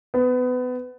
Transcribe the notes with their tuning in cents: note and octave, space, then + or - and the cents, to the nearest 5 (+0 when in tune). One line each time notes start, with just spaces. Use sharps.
B3 +25